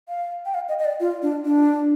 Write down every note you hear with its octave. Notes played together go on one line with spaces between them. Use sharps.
F5
G5
F5
D#5
D#5
D5
F4
D4
D4